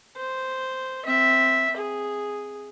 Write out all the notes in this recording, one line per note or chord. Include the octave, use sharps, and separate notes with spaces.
C5
C4 E5
G#4